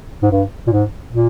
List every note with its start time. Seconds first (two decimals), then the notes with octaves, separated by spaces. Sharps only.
0.22 G#2
0.31 G2
0.67 A#2
0.72 G#2
1.13 A#2